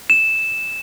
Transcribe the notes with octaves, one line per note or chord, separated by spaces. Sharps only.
E7